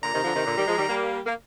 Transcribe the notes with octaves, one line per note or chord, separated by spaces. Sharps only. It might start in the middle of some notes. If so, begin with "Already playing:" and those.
A#2 D3 A#5
C3 D#3
D3 F3
C3 D#3
A#2 D3
D#3 G3
F3 G#3
D#3 G3
G3 A#3
A#3